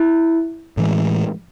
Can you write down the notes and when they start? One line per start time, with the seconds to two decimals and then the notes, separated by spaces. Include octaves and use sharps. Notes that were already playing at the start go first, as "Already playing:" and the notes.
Already playing: E4
0.77 A2 E3 G#3